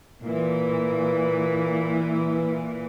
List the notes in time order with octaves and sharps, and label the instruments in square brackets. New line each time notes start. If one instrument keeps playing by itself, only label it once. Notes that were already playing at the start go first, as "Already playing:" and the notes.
[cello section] A#2 E3